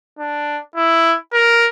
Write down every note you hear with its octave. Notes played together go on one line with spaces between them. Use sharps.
D4
E4
A#4